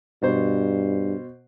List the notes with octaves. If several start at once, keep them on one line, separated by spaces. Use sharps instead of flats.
G2 B2 C5